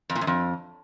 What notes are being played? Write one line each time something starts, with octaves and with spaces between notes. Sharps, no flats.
F2
A#2
F#2
F2